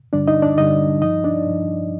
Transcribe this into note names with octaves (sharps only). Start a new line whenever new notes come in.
G2 D3 G3 D4 D5
D#4 D#5
D4 D5
G2 D3 G3 D#4 D#5
G2 F3 D#4 D#5
D4 D5
G2 F3